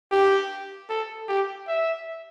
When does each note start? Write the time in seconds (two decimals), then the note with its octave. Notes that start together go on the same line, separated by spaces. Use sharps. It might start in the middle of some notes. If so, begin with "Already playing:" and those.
0.11 G4
0.89 A4
1.28 G4
1.68 E5